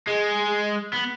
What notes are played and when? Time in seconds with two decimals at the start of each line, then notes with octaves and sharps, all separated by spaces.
0.07 G#3
0.93 B3